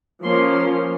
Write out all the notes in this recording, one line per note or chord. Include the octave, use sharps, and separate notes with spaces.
F3 A#3 C#4 C6
C6